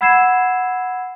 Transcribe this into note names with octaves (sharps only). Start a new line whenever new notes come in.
F#5 B5 E6 G#6 C7 E7